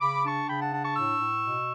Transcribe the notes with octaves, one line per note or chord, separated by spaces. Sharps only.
C#3 B5 D6
D4 A5 C#6
C#3 G5 B5
F#5 A5
D4 F#5 A5
A5 C#6
A2 C#6 E6
A2
B2